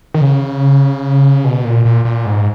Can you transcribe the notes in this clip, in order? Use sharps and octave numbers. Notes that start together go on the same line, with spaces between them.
D#3
C#3
B2
A#2
A#2
A#2
G#2